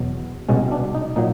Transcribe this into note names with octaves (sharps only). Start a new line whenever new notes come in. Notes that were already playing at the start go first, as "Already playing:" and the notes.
Already playing: E2 B2 F#3
C2 B2 G#3 C#4
D4
D#4
A#2 F#3 D#4